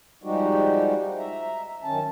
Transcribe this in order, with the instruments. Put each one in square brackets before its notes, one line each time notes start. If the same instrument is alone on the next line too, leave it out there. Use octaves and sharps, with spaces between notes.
[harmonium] F3 G3 G#3 D#4 F#4 G4
E5 A#5
F#2 D#3 C#4 A5